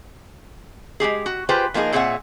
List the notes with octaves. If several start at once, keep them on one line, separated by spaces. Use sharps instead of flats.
G#3 C4 G4 G#4
F#4
F4 G4 G#4 B4 C5 G5
F3 A#3 D#4 F4 G#4
A#2 C4 G#4 C#5 E5 F#5